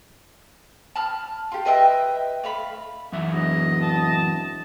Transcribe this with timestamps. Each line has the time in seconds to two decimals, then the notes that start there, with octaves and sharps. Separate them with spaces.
0.96 A5 B5 F6
1.52 F4 G4
1.65 B4 D#5 E5 G5
2.43 A3 F5 B5
3.12 F#2 E3 E5
3.33 E1 D#5
3.83 A5